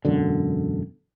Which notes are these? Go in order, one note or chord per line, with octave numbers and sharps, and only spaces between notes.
E1 F#2 D3